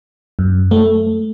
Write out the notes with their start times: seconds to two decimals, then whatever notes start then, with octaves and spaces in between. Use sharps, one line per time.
0.39 F#2
0.71 A3